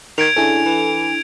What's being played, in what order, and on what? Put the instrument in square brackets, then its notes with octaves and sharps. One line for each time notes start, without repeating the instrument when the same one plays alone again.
[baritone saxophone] D#3 [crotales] G#6 D7 F7
[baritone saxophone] C#3 [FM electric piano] D4 E4 A4 [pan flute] G#5
[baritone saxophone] E3